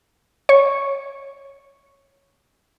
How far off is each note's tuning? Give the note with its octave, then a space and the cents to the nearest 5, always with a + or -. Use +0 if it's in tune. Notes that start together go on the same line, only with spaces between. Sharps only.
C#5 +0 C#6 +0